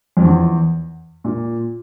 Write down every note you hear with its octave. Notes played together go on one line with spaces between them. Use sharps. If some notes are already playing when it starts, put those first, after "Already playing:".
F2
E2
A#2